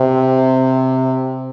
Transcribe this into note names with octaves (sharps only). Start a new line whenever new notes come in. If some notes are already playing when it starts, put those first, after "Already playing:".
Already playing: C3